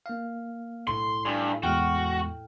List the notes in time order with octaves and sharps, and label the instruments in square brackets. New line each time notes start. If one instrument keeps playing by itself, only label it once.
[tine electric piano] A#3 F5
[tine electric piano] B1 [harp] A2 [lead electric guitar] C6
[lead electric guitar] G2 [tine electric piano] G#5
[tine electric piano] E2 G#3 [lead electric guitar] F#4 [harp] G5 F6